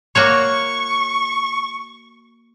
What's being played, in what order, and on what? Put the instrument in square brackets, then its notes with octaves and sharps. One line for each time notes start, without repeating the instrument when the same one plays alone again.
[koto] A#3 F#4 C#5 [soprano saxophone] C#6